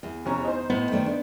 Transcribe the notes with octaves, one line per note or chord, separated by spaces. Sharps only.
E2
F1 C#4 A#5
D#4 C5
A2 B3
D#3 A3 D5
D4